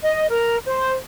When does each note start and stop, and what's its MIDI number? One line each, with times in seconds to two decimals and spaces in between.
0.03 0.28 75
0.30 0.56 70
0.66 0.92 72